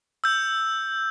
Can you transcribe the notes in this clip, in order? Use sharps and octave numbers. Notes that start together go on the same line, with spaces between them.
E6 G6